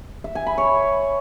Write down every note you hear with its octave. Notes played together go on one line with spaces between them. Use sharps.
E5
G#5
B5
C#5